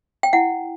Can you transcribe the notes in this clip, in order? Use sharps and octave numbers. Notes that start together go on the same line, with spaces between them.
G5
E4 F#5